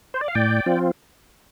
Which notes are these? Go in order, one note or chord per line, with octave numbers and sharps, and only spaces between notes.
C5
D5
F5
A2 D5 G5
F3 C4 F4